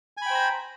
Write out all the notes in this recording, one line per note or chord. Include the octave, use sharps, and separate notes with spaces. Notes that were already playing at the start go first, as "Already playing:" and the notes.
C5 G5 G#5 A#5 B5